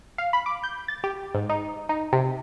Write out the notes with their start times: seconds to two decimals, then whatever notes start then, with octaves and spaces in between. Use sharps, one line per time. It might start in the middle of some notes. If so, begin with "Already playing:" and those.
0.18 F5
0.33 B5
0.46 D6
0.64 G6
0.88 A6
1.04 G4
1.35 G#2
1.49 D#4
1.89 D#4
2.13 C3